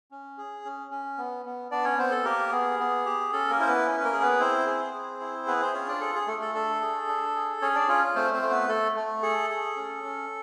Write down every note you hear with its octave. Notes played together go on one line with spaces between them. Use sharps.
C#4
G#4
C#4
C#4
B3
B3
B3 D4 D5
C#4 C#5
B3 C4 C5
A4
A#3 G4 A#4
B3 G#4
B3
G4
C#4 A4
A#3 A#4
E4 C5
B3 B4
C#4
B4
A#3 A#4
G#4
B3 B4
C4 E4 C5
G#4
G#4
E4
B3 G#4 B4
C4 C5
C#4 F4 C#5
D4 D5
G#4 A4
G#4
A3 A4
A4
D4 A4
G#4
D4
G#4
C#4 G#4 C#5
D4 D5
C#4 F4 C#5
A3 C4 C5
C4 C5
A3
B3 B4
A3 A4
A3
G#4 A4
G#4
C#4
C#4